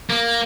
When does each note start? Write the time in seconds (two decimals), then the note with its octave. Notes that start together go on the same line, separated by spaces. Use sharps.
0.10 A#3